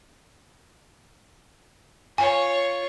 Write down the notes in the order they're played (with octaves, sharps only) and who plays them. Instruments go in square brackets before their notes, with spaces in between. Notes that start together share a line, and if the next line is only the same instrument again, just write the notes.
[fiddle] F4 C#5 [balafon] G#5